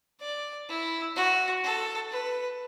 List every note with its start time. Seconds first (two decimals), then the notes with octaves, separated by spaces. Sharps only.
0.21 D5
0.69 E4
1.16 F#4
1.63 A4
2.11 B4